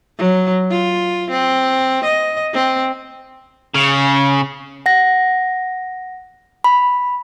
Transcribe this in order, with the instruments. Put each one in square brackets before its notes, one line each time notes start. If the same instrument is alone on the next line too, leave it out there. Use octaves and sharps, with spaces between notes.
[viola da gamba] F#3
F4
C4
D#5
C4
[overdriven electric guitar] C#3
[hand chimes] F#5 A#6
B5